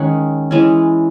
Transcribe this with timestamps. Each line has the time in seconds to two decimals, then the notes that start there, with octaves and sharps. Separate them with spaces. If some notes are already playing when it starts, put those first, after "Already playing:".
Already playing: D#3 G#3 C#4 F#5
0.51 E3 G#3 C#4